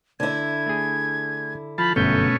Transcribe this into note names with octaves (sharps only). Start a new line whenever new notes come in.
D3 E4 G#6
A3 G#4
F3 A5 B5
G1 F#2 B2 A3 C#4 G6